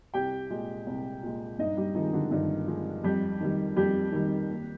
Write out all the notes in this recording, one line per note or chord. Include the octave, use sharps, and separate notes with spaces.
C2 G4 G5
A#2 G#3
C2
A#2 G#3
G2 D#4 D#5
G3 G4
D#3 F3 G#3 D#4
D3 D4
G2 D#3 D#4
F3 G#3
F2 G3 G4
D#3 G3
F2 G3 G4
D#3 G3
D#2